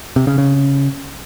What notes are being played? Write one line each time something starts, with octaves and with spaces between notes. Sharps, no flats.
C3
C#3
C#3